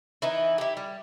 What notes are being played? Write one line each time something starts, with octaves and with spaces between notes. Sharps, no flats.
E3 D#4 E4
E4 G4
G3